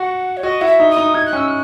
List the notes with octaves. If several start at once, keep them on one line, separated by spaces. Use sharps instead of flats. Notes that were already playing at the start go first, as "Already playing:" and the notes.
Already playing: F#4 F#5
C#5
F#4 D#5
E4 F#5
E5
D#4
D#6
D#4
D#4 G#6
F#6
C#4 E6
F#6